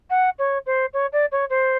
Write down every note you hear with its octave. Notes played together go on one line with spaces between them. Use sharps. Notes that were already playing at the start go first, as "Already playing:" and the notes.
F#5
C#5
C5
C#5
D5
C#5
C5